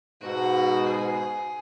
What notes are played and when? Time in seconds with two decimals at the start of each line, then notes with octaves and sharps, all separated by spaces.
0.22 G#2 B2 F#4
0.89 G#4